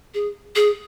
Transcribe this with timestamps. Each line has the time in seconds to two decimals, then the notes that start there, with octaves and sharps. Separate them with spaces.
0.14 G#4
0.56 G#4